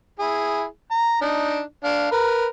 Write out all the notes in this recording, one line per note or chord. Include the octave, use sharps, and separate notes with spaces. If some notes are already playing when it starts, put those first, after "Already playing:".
E4 G#4
A#5
D4 D#4
D4 F5
A#4 B4